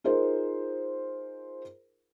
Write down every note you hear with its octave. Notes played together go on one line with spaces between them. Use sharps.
D#4 F4 G#4 A#4 C5